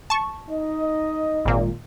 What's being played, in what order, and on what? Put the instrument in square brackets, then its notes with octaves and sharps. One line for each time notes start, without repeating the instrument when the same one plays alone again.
[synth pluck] A5 C#6
[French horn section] D#4 D#5
[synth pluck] G#1 A#2